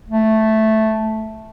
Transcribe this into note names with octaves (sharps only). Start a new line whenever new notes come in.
A3